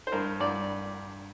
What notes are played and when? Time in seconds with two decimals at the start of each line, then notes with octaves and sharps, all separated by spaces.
0.07 C5
0.12 G2 A#4
0.40 G2 D5